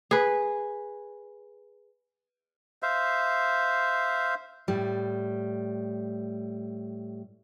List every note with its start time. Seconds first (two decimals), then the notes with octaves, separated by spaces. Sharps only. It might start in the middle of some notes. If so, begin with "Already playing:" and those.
0.11 G#4 B4
2.83 C5 E5 F5
4.68 A2 G3